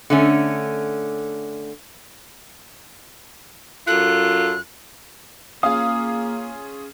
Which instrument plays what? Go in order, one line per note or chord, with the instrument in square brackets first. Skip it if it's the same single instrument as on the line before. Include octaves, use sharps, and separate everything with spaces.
[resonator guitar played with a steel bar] D3 A3 C#4
[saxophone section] F#2 F4 A4 [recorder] F#6
[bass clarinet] A#3 [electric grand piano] C#4 F4 G#4 [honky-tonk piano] F5 [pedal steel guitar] D#6